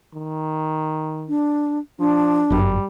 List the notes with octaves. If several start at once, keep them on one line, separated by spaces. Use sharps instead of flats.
D#3
D4
F3 D4
G1 F#2 G3